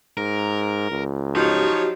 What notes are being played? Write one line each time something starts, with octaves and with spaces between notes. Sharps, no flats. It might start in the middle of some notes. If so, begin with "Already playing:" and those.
G#2 A#4
C#2
F3 F#3 D#4 F#4 G4 C#5